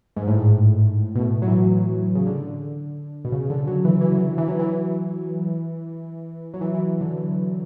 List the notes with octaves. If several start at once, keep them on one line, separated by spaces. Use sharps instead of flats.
G#2
A2
G#2
B2
A2
F#3
E3
C#3
D3
B2
C#3
D3
F#3
E3
E3
F#3
E3
F#3
E3
F#3
E3
E3
D3